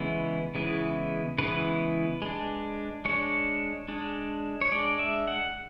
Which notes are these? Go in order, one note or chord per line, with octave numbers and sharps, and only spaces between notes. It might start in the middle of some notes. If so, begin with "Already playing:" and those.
Already playing: C#3 E3 G#3 B3 E4
C#3 E3 G#3 B3 E4
C#3 E3 G#3 B3 E4 B4
G#3 D4
G#3 D4 C#5
G#3 D4
C#5
G#3 D4 D5
E5
F#5